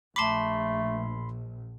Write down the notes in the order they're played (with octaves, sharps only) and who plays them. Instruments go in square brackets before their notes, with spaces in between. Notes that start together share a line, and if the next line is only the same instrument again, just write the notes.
[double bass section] A#1 [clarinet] A3 [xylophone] A5 D6 [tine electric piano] B5 C6